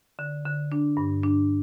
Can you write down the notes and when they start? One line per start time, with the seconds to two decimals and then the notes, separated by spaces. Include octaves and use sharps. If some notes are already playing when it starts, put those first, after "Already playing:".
0.19 D3
0.46 D3
0.72 D4
0.97 G2
1.23 D4